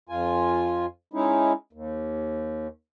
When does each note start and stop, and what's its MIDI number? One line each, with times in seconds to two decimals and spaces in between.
0.09 0.86 41
0.09 0.86 65
0.09 0.86 80
1.13 1.53 56
1.13 1.53 61
1.13 1.53 63
1.13 1.53 64
1.73 2.67 39